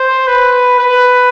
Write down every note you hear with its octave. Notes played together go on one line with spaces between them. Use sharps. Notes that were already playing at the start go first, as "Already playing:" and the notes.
Already playing: C5
B4
B4